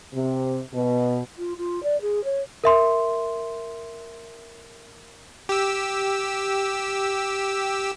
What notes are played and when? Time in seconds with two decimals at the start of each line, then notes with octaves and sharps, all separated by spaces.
0.13 C3
0.73 B2
1.38 F4
1.58 F4
1.83 D5
2.01 G#4
2.24 C#5
2.64 A#4 E5 C6
5.49 G4 E6